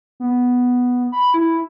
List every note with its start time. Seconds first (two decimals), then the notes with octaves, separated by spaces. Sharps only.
0.20 B3
1.12 B5
1.34 E4